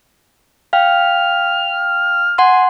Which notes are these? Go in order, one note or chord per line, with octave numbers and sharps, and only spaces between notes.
F5 G5 F6
F#5 G#5 C6